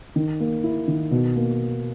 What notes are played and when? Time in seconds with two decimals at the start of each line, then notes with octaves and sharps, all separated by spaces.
0.16 D#3
0.40 A#3
0.64 E4
0.88 D#3
1.11 B2
1.36 A#3